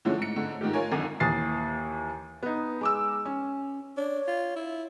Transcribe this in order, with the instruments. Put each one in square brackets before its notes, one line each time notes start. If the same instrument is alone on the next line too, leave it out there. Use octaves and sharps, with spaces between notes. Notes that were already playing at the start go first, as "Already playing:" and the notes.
[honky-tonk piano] D3 E3 F3 G#3 C#4
G#2 C#7
G#2 D3
G#2 D#3 F3 G4
F4 A#4 C#5 G#5
G#1 F#2 D3 D#4 D#7
[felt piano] D#2 E3 D#6 A6 C7
B3 D#4
G#3 D6 E6
C#4
[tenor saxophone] D4 [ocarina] C#5
[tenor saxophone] F4
E4